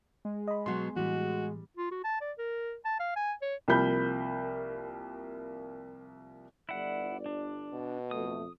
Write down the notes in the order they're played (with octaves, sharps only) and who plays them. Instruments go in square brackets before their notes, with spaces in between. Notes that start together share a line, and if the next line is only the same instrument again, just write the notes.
[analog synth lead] G#3
[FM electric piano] D#5 B5
[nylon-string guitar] B2 F#3 [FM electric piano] C6
[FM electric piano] A2 E3 [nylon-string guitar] G3 [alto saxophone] F#4
[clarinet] F4
F#4
A5
D5
A#4
A5
F5
G#5
C#5
[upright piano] C2 F3 A#3 A#4 B5 G6
[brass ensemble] G1 D5 [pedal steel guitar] E4 F#5
[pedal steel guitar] D4
[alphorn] B2
[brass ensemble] F#1 F2 A3 [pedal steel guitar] D#6